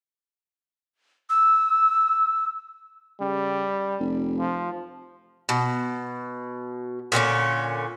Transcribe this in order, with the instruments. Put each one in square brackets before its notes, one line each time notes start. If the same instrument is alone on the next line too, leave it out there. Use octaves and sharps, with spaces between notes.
[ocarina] E6
[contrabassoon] C#3 [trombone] G3
[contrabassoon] F1
[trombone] F3
[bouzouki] B2
A#2 D3 B3 C#4